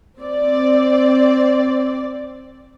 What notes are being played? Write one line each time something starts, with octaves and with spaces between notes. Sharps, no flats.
C4 D5